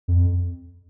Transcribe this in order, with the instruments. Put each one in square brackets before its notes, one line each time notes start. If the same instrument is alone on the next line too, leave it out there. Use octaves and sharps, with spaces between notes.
[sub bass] F2